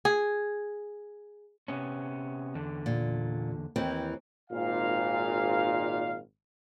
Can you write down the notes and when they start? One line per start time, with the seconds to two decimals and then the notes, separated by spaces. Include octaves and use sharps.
0.05 G#4
1.68 C3 B3 C#4
2.55 E2 D3
2.86 A#2
3.76 D#2 E3 C4
4.50 G#1 A#2 F5